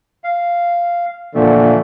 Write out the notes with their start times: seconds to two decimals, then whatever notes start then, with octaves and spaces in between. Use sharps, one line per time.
0.24 F5
1.35 A#2 D3 E3 F3 A3